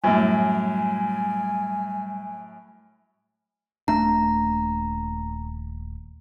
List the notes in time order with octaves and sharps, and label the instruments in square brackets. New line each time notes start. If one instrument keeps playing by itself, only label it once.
[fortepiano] F#2 A2 [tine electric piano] G3 [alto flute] G#5
[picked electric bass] D#1 A3 D4 [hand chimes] A#5